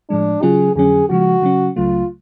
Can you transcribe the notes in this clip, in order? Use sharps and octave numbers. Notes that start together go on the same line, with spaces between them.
A2 F3 G#3 D4
C#3 F#3 C#4 F4 G#4
F2 D3 F#3 C#4 G#4
C#3 F3 G#3 F#4
C#3 F#3 C#4
C#2 C#3 F#3 A3 F4